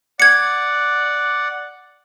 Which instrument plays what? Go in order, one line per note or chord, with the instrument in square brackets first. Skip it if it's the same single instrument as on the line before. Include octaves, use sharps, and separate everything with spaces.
[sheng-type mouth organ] D5 F#5 [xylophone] G#6 C#7